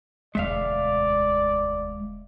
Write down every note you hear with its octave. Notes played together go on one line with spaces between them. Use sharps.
E1 D2 G#3 D5 E5 F5